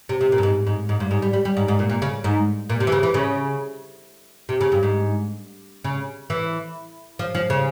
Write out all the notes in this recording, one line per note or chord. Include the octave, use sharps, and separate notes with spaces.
C3
C3
A#2
G2
G#2
G#2
G#2
G2
G#2
G3
G3
G3
G#2
G#2
A#2
A#2
C#3
G#2
A#2
C3
E3
C#3
E3
C#3
C3
C#3
G2
G#2
C#3
E3
F3
F3
C#3